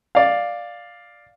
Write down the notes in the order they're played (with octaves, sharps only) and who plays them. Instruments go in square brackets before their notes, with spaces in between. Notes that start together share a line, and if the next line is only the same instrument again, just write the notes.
[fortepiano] D5 F5